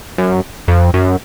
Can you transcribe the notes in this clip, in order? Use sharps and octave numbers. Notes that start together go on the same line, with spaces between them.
F#2
F2
F#2